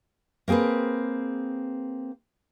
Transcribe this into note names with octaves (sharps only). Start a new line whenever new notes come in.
A#3 C4 G#4 A#4 B4